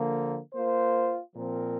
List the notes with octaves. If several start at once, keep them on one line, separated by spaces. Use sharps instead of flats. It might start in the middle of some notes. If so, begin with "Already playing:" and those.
Already playing: D3 F3 A#3
A#3 F4 C5
A#2 F3 C4 A#4